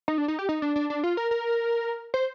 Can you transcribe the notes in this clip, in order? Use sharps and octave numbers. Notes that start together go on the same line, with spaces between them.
D#4
D4
D#4
G4
D#4
D4
D4
D4
F4
A#4
A#4
C5